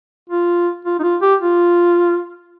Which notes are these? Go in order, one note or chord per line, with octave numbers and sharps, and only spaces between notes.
F4
F4
D#4
F4
G4
F4